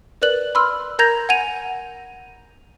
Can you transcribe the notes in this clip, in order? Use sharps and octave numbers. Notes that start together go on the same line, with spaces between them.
A#4 B4 D5 F#6 F#7
B5 C6 E6 F6
A#4 A#5 G6 G#6 A#6 F7
F#5 G#5 G#6 D#7 F7